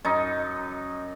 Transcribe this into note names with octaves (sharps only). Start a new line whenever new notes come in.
F#2 D#4